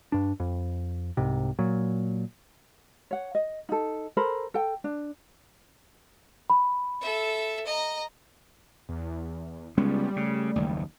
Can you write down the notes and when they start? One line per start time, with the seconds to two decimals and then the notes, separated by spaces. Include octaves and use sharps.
0.12 G2 D4
0.40 F2
1.17 C2 G#2 C3
1.59 A#2 F#3
3.11 C#5 F#5
3.35 D#5
3.69 D#4 A4
4.17 A4 A#4 C5 B5
4.54 A4 G5
4.84 D4
6.50 B5
7.01 A4 E5
7.67 D#5 A#5
8.89 E2
9.78 C#2 G3 G#3 B3 C#4
10.16 C#3 A3
10.56 F#1 D#2